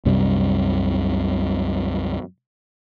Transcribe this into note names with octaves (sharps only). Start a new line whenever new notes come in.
C2 F#2 C3 G3